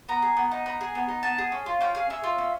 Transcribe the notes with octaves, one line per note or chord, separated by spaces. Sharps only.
B3 A#5
G#4
B3
D#4
B3 A#5
G#4
B3
D#4
B3 A5
G#4
C#4
F4
C#4 G5
G#4 F5
C#4 E5
F4
C#4